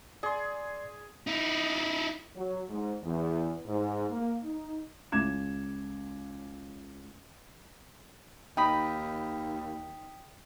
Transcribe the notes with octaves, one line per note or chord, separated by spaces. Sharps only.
G#4 D5 C6
D#4 E4
F#3
G#2
E2
G#2
A#3
D#4
C#2 D6 G#6 E7
D#2 D#4 G5 B5 D#6 B6